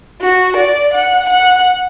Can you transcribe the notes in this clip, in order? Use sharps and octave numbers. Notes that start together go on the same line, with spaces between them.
F#4
D5
F#5
F#5